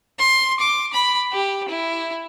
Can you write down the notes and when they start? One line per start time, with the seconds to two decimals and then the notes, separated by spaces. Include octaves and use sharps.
0.19 C6
0.60 D6
0.93 B5
1.32 G4
1.69 E4